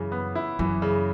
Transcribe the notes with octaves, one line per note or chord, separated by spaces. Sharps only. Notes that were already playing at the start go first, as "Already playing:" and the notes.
Already playing: F#2 C#3 E3
B3
E4
F#2 E3
C#3